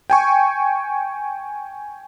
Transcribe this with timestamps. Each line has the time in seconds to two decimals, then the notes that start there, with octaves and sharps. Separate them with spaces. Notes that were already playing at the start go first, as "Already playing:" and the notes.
0.10 G5 G#5 C#6